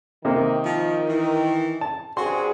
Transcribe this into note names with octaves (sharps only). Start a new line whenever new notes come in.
C3 D#3 A#3
F3
E3
A5
G2 C4 F#4 G#4 C6